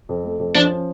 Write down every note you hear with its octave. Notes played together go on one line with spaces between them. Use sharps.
F2
A3
F2
F3 D4
C#4